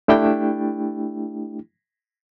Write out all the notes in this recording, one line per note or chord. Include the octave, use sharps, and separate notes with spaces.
A3 D4 E4 G4 G5